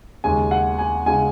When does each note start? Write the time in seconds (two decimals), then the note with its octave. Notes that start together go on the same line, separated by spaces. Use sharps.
0.24 D#2 C#3 G#3 G#5
0.51 F#5
0.78 G#5
1.06 C#3 G#3 G#5